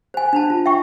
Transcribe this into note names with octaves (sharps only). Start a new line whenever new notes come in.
C5 G#5
D4 C5 A5
F4
E5 G5 C#6